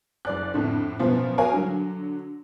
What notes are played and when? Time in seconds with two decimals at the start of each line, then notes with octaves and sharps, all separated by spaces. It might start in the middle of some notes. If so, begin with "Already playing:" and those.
0.25 F#1 D5 F#6
0.54 F2 A2 D3
0.99 F#2 B2 F3 B3 F4
1.38 F#4 A#4 C#5 F5 G#5
1.53 D3 F#3